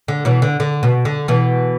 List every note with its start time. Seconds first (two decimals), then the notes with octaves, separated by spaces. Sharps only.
0.08 D3
0.25 B2 E3
0.42 D3
0.60 D3
0.83 B2
1.05 D3
1.28 B2 E3